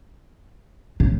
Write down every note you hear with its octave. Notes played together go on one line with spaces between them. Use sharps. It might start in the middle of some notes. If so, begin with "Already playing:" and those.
A2